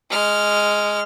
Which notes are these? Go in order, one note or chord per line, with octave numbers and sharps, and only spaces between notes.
G#3 F6